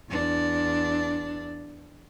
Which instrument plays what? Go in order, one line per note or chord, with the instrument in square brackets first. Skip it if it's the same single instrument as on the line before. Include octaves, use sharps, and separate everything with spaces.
[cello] E2 D4